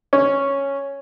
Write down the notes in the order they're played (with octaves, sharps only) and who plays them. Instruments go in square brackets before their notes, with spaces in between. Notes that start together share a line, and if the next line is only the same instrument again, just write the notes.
[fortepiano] C#4